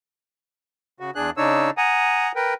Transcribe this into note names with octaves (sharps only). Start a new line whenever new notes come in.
C#3 F#4
E2 D4 G#4 F#6
C#3 D4 D#4 C#5 E6
F#5 G#5 A#5 D#6
A#4 B4 G5